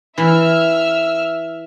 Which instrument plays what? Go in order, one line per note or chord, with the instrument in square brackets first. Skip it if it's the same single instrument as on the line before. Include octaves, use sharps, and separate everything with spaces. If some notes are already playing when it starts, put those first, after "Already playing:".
[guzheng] E3 [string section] E5 E6 F6